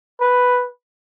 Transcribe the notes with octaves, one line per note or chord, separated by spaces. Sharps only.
B4